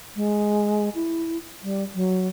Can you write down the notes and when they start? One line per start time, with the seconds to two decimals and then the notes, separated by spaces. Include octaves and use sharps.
0.16 G#3
0.95 E4
1.63 G3
1.95 F#3